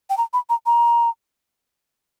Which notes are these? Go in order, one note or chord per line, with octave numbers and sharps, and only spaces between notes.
G5
A#5
B5
A#5
A#5